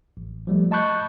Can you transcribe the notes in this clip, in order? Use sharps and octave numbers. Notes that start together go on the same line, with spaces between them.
A1
F3 G3 A3
D#5 A5 B5 C#6 F#6 G6